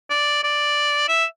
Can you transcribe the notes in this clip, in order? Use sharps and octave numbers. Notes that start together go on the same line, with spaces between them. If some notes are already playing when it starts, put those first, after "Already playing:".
D5
D5
E5